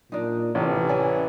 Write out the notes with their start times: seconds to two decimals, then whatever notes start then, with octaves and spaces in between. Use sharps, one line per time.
0.12 A#2 D4 D#4
0.55 A1 C3 E3
0.89 C#4 D5 G#5